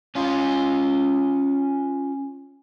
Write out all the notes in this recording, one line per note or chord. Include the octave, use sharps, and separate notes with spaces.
C#4 F4